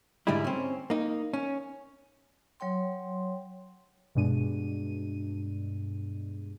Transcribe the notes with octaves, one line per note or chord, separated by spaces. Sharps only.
G#2 D3 G3 G#3 D#4 E4
C4 C#4
A#3 D#4
C#4
F#3 C#5 G5 C6
G2 B2 G#3 D4 D#7